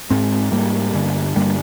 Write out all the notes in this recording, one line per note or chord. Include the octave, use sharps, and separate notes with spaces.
G#2 G#3 C4
G#2 G3 A#3
G2 D3
G2 D3 G3 A#3